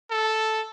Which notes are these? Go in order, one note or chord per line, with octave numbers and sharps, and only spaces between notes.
A4